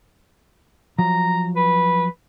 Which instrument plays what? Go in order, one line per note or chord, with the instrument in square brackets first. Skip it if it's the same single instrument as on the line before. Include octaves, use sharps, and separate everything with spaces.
[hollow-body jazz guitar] F3 F#3 [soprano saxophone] A#5
[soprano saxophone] B4